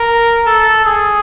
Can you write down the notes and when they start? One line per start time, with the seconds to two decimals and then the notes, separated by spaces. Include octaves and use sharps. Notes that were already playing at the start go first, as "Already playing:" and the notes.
Already playing: A#4
0.46 A4
0.85 G#4